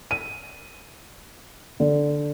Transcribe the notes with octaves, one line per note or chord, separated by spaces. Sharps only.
D#7
D3